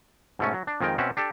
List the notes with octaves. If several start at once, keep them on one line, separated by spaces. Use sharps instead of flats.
G#2 B2 A3 C#4
F#3
D4
F2 D#3 G#3 A#4 G5
B2 C4 C#4 E5 F#5
D4 G4 A4